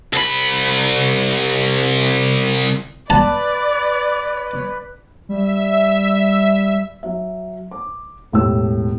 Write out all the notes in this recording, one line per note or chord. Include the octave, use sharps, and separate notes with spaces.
C2 B5
B4 D5 A5
G3 E5
F#3 E5
D6
E1 A2 G4 E6